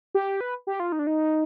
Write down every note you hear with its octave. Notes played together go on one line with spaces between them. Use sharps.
G4
B4
G4
F4
D#4
D4
D#4